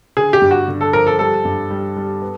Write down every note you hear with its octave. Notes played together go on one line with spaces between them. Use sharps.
D3 G#4
G4
G2
F#4
D3
A4
F3 A#4
A4
G3 A4
G2
G3
G3
B3